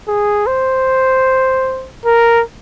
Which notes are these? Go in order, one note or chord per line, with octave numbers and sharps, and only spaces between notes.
G#4
C5
A#4